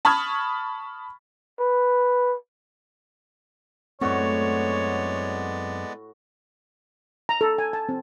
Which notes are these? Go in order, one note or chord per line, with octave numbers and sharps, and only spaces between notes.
A5 B5 C#6 D#6 F6 G#6
B4
F#2 A2 G#3 B3 C4 F#4 C#5 D5
A#5
A4
G#5
A5
C4